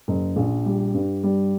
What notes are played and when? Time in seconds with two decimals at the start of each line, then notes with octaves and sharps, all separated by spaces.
0.08 F#1
0.36 A#1
0.66 G3
0.94 G2
1.23 G3